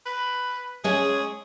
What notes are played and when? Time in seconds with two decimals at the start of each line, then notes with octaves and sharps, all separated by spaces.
0.06 B4
0.84 G#3 C#4 G#4